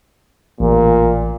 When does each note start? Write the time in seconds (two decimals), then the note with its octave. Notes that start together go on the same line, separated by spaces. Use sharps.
0.60 A1 A#2